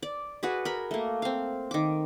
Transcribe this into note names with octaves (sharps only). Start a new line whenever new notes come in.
D5
F#4 G#4 B4
A#4 B5
A3 A#3
C4 F5
D#3 D6